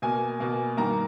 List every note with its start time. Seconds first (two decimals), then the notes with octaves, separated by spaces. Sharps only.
0.02 B2 A#3 G#5
0.40 B2 A#3
0.77 G2 D#3 A#3 A#5